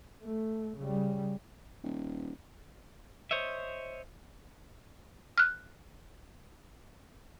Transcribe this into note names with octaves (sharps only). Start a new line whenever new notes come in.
A3
C#3 G3
D#1
C5 C#5 D#5 E5
F6 F#6